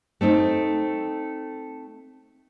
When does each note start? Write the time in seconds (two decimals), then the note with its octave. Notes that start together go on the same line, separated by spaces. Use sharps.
0.21 A3 C4 D#4